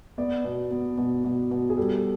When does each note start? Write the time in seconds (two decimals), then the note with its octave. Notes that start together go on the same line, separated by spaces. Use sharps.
0.18 B3 D5
0.44 B2
0.71 B3
0.98 B2
1.24 B2
1.51 B2
1.70 G#4
1.77 G3 A4